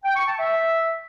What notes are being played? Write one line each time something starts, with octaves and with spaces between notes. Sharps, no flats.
G5
C#6
A5
E5